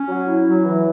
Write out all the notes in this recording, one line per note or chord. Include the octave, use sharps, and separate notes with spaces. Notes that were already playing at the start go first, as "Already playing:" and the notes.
Already playing: C#4
F#3
E4
F#3
E3